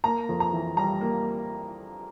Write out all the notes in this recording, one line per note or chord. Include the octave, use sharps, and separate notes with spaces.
A#3 A#5
F2
A#5
E3
G3 A#5
A#3